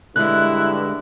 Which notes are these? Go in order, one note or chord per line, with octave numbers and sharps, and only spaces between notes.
G2 D3 G#3 E4 F#6